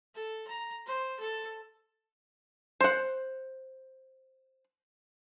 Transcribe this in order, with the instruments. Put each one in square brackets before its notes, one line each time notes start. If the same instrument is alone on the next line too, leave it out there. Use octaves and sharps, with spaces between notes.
[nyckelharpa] A4
A#5
C5
A4
[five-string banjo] C5 F#5